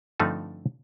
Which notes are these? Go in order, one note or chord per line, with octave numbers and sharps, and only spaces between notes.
G2 D3 F3 A3 C4 D#4